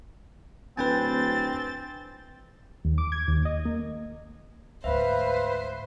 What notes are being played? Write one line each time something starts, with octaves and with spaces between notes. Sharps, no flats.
D1 C4 B4 G5 G#5 A6
D#2
D6
G#6
D#2
D#5
A#3
D2 G#2 B4 C5 E5 F5